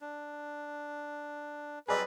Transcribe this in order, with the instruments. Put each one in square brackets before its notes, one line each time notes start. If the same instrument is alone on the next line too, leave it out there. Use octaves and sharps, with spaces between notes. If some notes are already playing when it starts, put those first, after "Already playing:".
[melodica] D4
[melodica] F#3 G3 C4 [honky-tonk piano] G#4 D5 D#5 [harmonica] B4